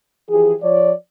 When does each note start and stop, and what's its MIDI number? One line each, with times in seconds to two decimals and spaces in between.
0.29 0.54 52
0.29 0.54 53
0.29 0.54 67
0.29 0.54 68
0.61 0.91 53
0.61 0.91 73
0.61 0.91 74